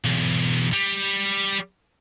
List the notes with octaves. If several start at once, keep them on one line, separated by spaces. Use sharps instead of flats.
B1 E2
G3